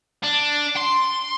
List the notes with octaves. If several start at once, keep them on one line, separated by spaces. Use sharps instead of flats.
D4
C6